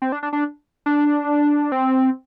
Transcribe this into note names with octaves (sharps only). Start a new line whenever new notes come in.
C4
D4
D4
D4
D4
C4